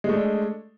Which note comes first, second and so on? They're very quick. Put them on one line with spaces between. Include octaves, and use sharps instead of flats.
G#3 A3 D4